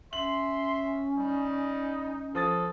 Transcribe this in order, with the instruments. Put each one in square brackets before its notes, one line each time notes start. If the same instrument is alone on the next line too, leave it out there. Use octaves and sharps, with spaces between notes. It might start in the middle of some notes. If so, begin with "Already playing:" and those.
[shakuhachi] C#4 [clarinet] E5 [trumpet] C6 [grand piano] F#7
[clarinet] G3 [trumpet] D#4
[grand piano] F3 D#6 A6 [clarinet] A4